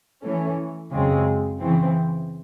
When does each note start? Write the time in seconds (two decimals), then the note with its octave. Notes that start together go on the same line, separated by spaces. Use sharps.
0.25 E3 A3 C#4
0.93 F#2 C#3 G#3 C4
1.61 C#3 E3 C4